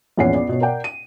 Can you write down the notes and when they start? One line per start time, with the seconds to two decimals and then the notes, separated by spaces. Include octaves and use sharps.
0.17 A#1 E2 C#4 F#5 C7
0.33 B3 D5
0.49 B2 C#5
0.61 A#4 D5 F#5 G5
0.84 D#7